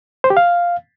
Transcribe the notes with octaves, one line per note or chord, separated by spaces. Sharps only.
C5
G4
F5